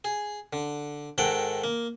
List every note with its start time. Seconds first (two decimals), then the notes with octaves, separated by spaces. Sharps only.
0.04 G#4
0.53 D3
1.18 G#2 D#3 A4 F#5 G5
1.64 A#3